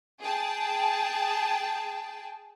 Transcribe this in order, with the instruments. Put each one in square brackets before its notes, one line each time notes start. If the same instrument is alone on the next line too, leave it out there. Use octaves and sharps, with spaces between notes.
[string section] G#4 G5 A5